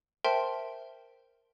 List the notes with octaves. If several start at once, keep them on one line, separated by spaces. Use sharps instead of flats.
A#4 C5 E5 G5 A5 C6